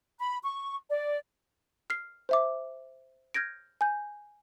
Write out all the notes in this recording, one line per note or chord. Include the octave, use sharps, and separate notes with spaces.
B5
C#6
D5
F6 C7
C5 E5 D6
F6 G6 G#6 A#6 D7
G#5 G6